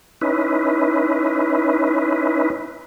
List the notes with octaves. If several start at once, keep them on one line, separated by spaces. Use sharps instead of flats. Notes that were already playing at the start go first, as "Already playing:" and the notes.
C#4 D#4 E4 B4